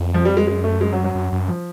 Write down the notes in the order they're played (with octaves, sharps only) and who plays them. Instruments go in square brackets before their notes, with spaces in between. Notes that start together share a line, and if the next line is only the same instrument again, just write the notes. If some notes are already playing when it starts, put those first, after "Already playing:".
Already playing: [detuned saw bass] F2
[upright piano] F3
G3
G#3
[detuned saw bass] F#2 [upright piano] G#3
[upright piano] A3
G#3
F#3
F#3
[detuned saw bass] F#2
F#2
[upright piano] F3